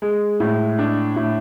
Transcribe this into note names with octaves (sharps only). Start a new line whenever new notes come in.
G#3
A2
D4
A2